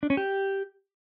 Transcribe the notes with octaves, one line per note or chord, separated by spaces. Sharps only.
D4
C#4
G4